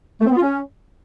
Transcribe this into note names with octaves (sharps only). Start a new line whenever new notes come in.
A3
C4
B3
F4
C#4